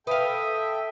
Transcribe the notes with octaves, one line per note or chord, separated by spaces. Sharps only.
A4 B4 E5 F5 G5 D#6